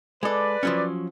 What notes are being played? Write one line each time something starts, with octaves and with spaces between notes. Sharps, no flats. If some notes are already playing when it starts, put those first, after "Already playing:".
G#3 A4 B4 D5
F3 F#3 C#4